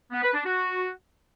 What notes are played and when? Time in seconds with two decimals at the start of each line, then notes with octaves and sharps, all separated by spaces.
0.12 B3
0.23 B4
0.34 D4
0.45 F#4